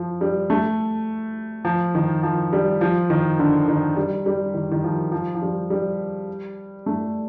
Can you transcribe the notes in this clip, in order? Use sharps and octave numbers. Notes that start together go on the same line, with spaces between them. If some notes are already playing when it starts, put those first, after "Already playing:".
Already playing: F3
G3
A3
F3
D#3
F3
G3
F3
D#3
D3
D#3
G3
G3
D#3
D#3
F3
F3
F3
G3
G3
A3